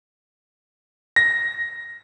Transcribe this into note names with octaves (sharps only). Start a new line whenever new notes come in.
A#6